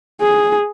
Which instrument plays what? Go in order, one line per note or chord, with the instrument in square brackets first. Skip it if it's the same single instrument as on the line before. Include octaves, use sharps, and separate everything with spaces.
[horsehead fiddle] G#4